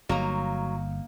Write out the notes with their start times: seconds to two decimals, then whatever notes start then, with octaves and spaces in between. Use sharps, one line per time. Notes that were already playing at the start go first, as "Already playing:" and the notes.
0.09 G1 F#3 A#3 D#4 A#5